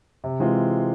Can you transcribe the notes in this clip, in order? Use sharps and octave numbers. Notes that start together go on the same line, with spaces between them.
C3
E3 G#3 C4 F4